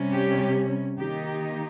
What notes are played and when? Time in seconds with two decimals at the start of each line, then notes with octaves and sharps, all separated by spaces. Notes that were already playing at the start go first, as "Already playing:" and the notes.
Already playing: C3 G3 C#4
0.14 G4
0.99 D#3 A#3 D#4 G4
1.27 G4